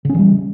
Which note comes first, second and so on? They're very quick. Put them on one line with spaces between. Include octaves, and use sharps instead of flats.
C#3 C#4 E3 G3